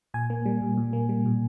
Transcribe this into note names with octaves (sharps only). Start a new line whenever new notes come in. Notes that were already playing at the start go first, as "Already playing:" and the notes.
A#2 G#5
A#3
G3
A#2
A#2
A#3
G3
A#2